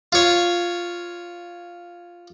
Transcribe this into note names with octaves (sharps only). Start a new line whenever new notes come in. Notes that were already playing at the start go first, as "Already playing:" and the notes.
F4 C#5